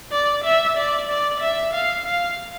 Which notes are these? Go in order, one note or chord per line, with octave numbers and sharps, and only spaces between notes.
D5
E5
D5
D5
E5
F5
F5